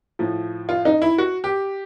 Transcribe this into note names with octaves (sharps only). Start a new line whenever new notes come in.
A2 F3
F4
D#4
E4
F#4
G4